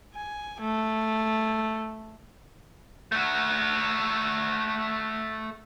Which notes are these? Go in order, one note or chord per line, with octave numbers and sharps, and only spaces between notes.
G#5
A3
A3 F#4